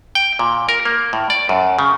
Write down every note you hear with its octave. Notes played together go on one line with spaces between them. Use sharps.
G5
A#2
A#4
A#3
A2
D5
F#2
C#3